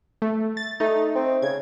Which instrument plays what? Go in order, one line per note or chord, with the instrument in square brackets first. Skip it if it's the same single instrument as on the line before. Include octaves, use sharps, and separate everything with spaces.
[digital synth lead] A3
A6
[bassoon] A3 [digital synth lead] D#4
[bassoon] C4
[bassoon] C#3 [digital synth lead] G#6